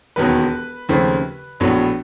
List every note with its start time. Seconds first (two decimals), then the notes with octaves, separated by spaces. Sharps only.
0.16 E1 D#2 D#3 F#3 B3 B4
0.89 D#2 C#3 F3 A3 C4
1.60 A#1 A2 F#3 B3